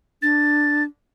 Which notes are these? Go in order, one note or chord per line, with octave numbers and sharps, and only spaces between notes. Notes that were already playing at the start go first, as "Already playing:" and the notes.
D4 A6